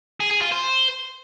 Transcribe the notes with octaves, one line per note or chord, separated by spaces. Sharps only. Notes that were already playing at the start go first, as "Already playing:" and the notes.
G#4
G#4
F4
C5